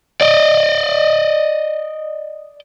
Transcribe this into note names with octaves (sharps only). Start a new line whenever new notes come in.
D5 D#5